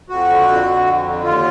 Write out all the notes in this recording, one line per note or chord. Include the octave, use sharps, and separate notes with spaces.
F2 F#4
D3
F2
D3
F2
D3
D#2 F4